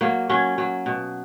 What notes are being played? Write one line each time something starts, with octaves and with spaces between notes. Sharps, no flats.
F#3 A#3
F#3 C#4
F#3
B2